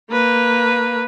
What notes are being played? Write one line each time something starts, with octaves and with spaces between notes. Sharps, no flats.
A#3 B4